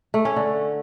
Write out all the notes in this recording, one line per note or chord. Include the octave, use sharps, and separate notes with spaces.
A3
C#4
D3